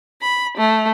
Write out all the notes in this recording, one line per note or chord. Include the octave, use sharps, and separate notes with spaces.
B5
A3